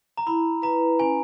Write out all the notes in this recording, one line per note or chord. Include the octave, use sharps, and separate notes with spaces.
A#5
E4 B5
B4 A#5
C#4 G#5